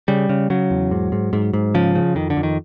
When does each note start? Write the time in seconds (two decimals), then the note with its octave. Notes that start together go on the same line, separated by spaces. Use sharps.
0.08 C#3 G3
0.29 C#3
0.50 C#3 F#3
0.70 E2
0.91 G#2
1.12 G#2
1.33 G#2
1.53 G#2
1.74 C#3 F3
1.95 C#3
2.15 F2 D#3
2.30 D3
2.37 F2
2.43 D#3